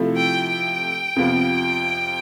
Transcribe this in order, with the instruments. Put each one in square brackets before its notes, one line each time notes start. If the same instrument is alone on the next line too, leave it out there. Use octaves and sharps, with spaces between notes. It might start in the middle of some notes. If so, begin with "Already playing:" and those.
Already playing: [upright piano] C3 F3 A3 E4 A4
[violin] G5
G5
[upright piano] F2 C3 F3 B3 F4